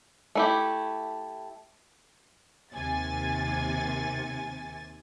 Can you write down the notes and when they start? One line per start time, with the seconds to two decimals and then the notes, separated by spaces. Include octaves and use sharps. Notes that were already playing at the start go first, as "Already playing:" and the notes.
0.35 A3 E4 G4
2.74 D#2 C3 G#5 A6